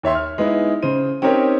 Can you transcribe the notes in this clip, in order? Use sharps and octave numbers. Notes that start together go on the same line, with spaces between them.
D#2 C#5 E5 C6
F6
G#3 B3 D#4 E4
C#3 C5 D#7
C4 C#4 D#4 G4 A#4 C#5